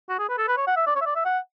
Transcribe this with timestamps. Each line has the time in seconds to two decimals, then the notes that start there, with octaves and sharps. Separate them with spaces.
0.09 F#4
0.19 G#4
0.29 B4
0.38 A4
0.48 B4
0.57 C#5
0.67 F#5
0.77 E5
0.87 D5
0.96 C#5
1.01 E5
1.06 D5
1.16 E5
1.25 F#5